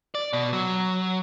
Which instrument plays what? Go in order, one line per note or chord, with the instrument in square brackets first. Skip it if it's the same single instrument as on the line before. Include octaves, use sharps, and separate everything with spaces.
[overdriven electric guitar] D5
B2
F#3